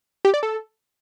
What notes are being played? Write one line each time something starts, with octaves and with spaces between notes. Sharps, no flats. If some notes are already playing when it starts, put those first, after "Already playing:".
G4
D5
A4